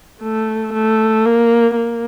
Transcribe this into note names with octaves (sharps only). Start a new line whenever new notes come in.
A3
A3
A#3
A#3